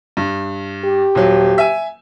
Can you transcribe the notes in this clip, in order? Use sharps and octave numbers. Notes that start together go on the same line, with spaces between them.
G2
G4
D#1 F#3
E5 G#5